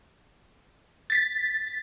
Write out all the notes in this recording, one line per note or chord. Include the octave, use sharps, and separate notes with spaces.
A6 B6